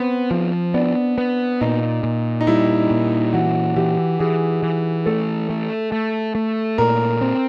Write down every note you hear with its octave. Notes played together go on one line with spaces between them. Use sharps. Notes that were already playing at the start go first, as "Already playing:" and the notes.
Already playing: B3 C4
F3
B3 D4
B3
A#2 D#4
A#2
D#4
G3 E4
A#2
E3 F#4
E3 G4
E3 G#4
E3
A3 A4
A3
A3
A3
A#2 A#4
C4